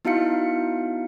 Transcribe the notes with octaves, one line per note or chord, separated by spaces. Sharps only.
B3 D#4 E4 F#4 F5 C#7